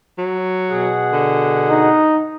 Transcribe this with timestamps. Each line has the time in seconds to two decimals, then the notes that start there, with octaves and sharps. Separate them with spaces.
0.18 F#3
0.70 B2 G#4 F#5
1.13 D3
1.69 D#4